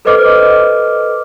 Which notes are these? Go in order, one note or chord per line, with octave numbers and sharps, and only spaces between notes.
A4 B4 C5 D#5 D6 F6